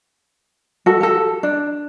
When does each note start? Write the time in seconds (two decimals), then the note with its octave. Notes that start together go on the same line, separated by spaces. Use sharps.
0.86 F#4 A4
1.01 G4 A4
1.43 D4